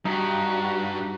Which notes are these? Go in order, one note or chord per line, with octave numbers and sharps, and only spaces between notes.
G2 D#4 F#4 G4